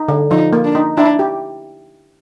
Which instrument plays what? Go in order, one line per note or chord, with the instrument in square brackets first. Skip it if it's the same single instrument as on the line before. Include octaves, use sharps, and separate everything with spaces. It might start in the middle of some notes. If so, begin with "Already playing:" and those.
Already playing: [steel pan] D#4
D3
[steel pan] F3 [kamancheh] D#4
[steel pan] A#3
[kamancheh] D4
[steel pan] D#4
[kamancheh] D4 [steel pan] E4
[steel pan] G4